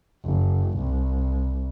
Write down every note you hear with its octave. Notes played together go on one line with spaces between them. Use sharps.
F#1
C2